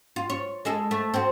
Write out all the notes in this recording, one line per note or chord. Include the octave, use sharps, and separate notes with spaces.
F4
C#5
G#3 G#4 A4
A3
C4 F#4